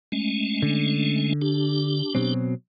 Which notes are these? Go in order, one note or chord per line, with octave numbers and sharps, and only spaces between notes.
G#3 A3 C#4
D3
D4 G4
B2 F#3 C4